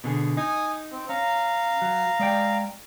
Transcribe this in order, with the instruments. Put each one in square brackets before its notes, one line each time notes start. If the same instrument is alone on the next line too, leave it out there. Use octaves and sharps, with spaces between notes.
[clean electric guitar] B2 D3 G#4
[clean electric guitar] D#4 [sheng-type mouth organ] G#5 D#6
[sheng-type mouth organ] C4
[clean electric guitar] C#4 [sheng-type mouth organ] F5 A#5
[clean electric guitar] F#3
G#3 D5 G5